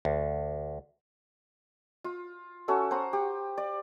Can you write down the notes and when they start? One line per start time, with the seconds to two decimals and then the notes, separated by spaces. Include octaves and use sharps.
0.05 D2
2.04 F4
2.68 C#4 F#4 A4 E5
2.91 C5 F#5 A#5 D#6
3.13 G4
3.58 D5